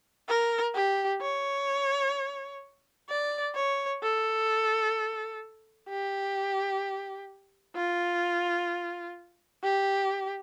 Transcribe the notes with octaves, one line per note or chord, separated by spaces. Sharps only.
A#4
G4
C#5
D5
C#5
A4
G4
F4
G4